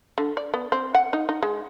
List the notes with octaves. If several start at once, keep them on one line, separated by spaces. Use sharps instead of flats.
D3
D5
B3
C4
F#5
D#4
D#4
G#3